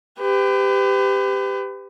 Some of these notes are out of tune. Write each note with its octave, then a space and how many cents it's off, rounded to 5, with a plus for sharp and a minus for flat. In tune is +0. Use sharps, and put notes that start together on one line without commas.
G4 +10 B4 +35